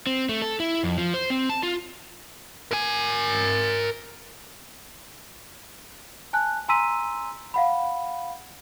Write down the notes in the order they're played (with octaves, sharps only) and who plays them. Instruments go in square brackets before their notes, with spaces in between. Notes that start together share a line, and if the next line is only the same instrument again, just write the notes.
[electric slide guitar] C4
A3
A4
E4
F2
F3
C5
C4
A5
F4
[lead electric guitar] A#4 G#5
[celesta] G#5 A5 F#6
G#5 A#5 C6 E6 B6 D#7
F5 F#5 B5